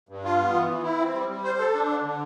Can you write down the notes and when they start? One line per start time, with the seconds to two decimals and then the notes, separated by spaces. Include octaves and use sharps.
0.09 G2
0.24 F4
0.39 B3
0.54 E3
0.69 E3
0.83 E4
0.99 C4
1.14 G3
1.29 G3
1.44 C5
1.59 A4
1.74 D4
1.89 D3
2.04 D3